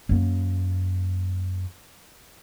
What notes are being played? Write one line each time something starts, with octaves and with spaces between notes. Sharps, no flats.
F#2 A#3